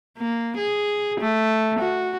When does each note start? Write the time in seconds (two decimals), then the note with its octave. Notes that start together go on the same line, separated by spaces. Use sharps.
0.18 A#3
0.58 G#4
1.20 A3
1.79 F#4